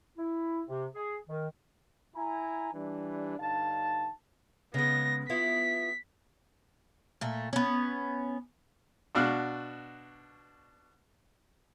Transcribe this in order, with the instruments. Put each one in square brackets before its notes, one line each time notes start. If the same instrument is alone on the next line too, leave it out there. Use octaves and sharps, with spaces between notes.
[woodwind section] E4
C3
G#4
D#3
[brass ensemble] E4 G#5 A#5
E3 G3 D4
G2 D3 D#4 F5 A5
[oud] C#3 G#3 [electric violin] B3 A#6
[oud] B3 E4 F4 [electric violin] B6
[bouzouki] A#2 A3
B3 C#4
[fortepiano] B2 D4 F#4 F5 F6 F#6